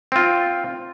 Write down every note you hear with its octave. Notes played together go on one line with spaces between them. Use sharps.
C4 F4